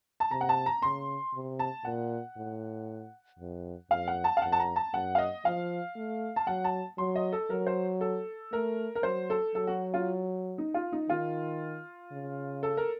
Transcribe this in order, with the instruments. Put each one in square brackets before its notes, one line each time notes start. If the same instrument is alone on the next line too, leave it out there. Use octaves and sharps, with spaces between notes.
[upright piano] A5
[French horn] C3 [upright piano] A#5
[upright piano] F#5
A5
A#5
[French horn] C#3 [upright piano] C6
[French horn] C3
[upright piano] A5
[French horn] A#2 [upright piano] F#5
[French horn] A2
F2
[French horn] F2 [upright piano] F5
[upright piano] F#5
A5
F5
[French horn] F2 [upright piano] F#5
[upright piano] A5
A#5
A5
[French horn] F#2 [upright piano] F#5
[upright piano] F5
D#5
[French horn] F3 [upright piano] F5
[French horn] A3
[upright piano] A5
[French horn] F#3 [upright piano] F#5
[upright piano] A5
[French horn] F#3 [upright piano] C6
[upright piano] D#5
A4
[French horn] F#3 [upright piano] A#4
[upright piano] C5
A4
[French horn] A3 [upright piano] A#4
[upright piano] A#4
[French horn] F#3 [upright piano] C5
[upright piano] A4
[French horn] F#3 [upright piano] A4
[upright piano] F#4
F4
D#4
F4
D#4
[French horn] D#3 [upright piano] F4
[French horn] C#3
[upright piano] A4
A#4